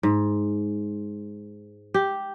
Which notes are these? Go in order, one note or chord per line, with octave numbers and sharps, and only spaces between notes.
G#2
G4